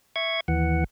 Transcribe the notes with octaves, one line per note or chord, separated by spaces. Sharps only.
E5 C#6 G#6
D#2 E3 F#5